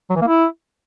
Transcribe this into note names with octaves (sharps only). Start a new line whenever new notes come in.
F#3
E3
A#3
E4